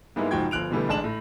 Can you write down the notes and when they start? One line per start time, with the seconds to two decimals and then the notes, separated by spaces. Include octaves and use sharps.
0.16 G#2 G3 G#3 A#3 B3 E4
0.31 F#1 G#2 F3 F#4 G5 G#6
0.51 G1 F3 F#6 D7 F7
0.71 B2 D3 E3 G3 A3 B3
0.88 A1 G#3 D4 A5 E7 F#7
1.04 A2